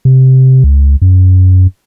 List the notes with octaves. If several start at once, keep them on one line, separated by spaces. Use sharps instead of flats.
C3
C#2
F#2